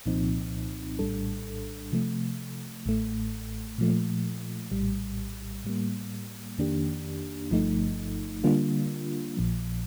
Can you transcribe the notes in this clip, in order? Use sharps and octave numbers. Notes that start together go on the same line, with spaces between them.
C2 A#2 F3 C4 D#4
A#1 A2 G3 D4 A4
C3 F3 A3
A1 A2 A3
A#2 F3 A3
A#1 A2 G3
A2 G3 A#3
F2 D#3 A#3 D4 G4
G1 G2 F3 A3 D#4
D3 G3 A#3 D4 F4
A#1 A#2 F3